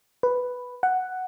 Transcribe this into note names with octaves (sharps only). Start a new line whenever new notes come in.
B4
F#5